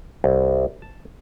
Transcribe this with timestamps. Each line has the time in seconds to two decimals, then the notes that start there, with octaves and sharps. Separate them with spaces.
0.24 C2
0.82 A5